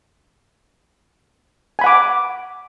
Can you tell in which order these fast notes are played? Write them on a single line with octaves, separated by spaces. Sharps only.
G#5 B5 F#5 D6